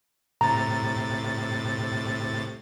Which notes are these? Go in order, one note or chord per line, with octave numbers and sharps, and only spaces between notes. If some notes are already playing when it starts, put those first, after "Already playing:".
A2 C3 A#5 A6